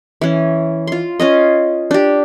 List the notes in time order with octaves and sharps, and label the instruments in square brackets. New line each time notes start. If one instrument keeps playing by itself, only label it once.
[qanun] E3 C#4
F4 C6
C#4 F4 D#5
D4 G4